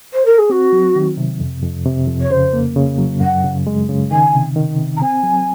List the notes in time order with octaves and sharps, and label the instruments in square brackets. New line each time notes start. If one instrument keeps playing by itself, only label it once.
[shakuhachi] C5
A#4
G#4
[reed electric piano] C4 [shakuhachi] F#4
[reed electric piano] F#3
D#3
C3
F2
F2
C3
F2
[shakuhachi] C#5
[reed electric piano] C#3 [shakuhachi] C5
[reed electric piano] A#3
C#3
F#3
[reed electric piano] F#2 [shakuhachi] F#5
[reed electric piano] C#3
G#3
C#3
[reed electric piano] D#3 [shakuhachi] G#5
[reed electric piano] C3
D#3
C3
[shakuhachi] A#5
[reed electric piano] C4 [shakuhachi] G#5
[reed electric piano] F#3